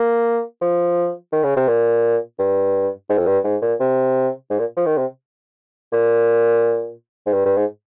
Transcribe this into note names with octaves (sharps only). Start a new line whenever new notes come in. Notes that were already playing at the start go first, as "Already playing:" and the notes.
Already playing: A#3
F3
D#3
C#3
C3
A#2
G2
G#2
F2
G2
G#2
A#2
C3
G#2
A#2
F3
D#3
C3
A#2
G#2
G2
G2
G#2